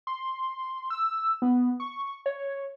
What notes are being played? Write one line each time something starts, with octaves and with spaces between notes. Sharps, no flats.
C6
E6
B3
C#6
C#5